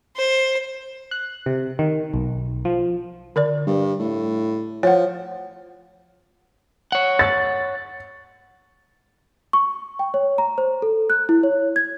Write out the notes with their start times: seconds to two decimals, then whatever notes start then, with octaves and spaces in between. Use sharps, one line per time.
0.16 C5
1.11 F#6
1.46 C3
1.79 D#3
2.14 B1
2.65 F3
3.36 D3 A#4 D5
3.66 G2
3.99 A2
4.83 F3 C#5 F#5
6.92 C#5 F#5
7.19 A6
9.53 C#6
9.99 G5
10.14 C#5
10.38 A#5
10.58 C5
10.82 A4
11.10 F#6
11.29 E4
11.43 C#5
11.76 G#6